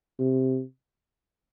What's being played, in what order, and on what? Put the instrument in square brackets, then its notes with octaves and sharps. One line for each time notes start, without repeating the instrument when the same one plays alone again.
[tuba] C3